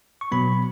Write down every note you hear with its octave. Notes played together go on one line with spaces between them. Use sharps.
C#6
B2 F#3 B3 B5